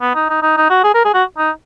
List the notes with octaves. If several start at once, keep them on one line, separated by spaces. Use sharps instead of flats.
B3
D#4
D#4
D#4
D#4
F#4
G#4
A#4
G#4
F#4
D#4